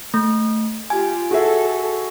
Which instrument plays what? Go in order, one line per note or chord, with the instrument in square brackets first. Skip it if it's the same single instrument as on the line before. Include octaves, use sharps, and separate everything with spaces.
[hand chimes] A3
[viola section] F4 G4 [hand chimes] G#5
[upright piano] F#4 G#4 E5 [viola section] A4